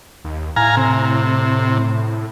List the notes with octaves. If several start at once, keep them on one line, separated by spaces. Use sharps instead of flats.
D#2
A2 F5 G#5 A#5
C3